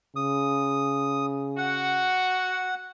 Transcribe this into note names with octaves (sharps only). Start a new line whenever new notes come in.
C#3 D#6
F#4 F#5